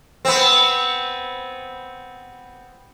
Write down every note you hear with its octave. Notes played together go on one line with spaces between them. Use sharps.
B3 C4